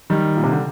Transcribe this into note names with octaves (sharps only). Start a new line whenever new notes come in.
D#3 G3
A#2
C3
D3